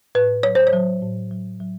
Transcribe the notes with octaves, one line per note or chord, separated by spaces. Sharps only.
A2 B4
F#3 C#5
C5
C#5
F#3
A2
F#3
F#3